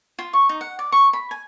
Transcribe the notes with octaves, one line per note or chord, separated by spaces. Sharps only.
F4
C#6
D#4
F#5
D5
C#6
B5
G#5